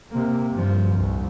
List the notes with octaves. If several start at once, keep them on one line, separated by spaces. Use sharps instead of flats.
C3 A#3
G2 F3
C2 F2